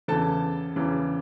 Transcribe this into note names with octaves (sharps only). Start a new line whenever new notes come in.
E2 C#3 E3 A4 A5
E2 C#3 E3